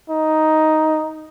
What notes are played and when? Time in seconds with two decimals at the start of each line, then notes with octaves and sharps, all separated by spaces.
0.10 D#4